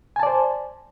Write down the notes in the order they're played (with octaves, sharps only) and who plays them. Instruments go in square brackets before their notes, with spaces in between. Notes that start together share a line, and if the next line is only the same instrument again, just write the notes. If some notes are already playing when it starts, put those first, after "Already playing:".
[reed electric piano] G#5
A5
D5
C5